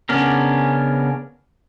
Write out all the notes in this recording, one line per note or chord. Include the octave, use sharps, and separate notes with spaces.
C#3 B3 C#4 D4 A#4